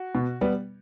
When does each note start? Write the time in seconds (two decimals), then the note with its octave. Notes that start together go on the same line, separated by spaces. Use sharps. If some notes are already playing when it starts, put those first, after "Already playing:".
Already playing: F#4
0.15 B2
0.41 G3 B3